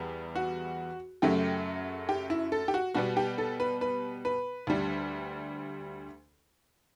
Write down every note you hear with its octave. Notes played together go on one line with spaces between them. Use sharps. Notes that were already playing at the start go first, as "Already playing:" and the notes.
Already playing: E2 G3 B3
F#4
F#2 C#3 F#3 A3 G4
G4
E4
A4
G4
F#4
B2 G3 B3 F#4
G4
A4
B4
B4
B4
D2 D3 G3